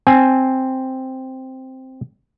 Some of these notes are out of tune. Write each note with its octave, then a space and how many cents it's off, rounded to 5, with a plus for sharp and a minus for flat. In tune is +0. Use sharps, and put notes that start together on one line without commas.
C4 +0 G#5 +0